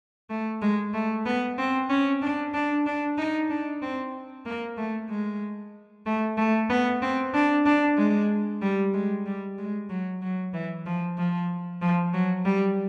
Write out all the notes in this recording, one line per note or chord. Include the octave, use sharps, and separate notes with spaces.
A3
G#3
A3
B3
C4
C#4
D4
D4
D4
D#4
D4
C4
A#3
A3
G#3
A3
A3
B3
C4
D4
D4
G#3
G3
G#3
G3
G#3
F#3
F#3
E3
F3
F3
F3
F#3
G3